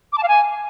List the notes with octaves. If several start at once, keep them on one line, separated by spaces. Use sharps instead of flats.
D6
A5
F5
G#5